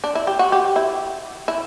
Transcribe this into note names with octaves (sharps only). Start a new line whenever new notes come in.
D4
E4
G4
F#4
G4
E4
E4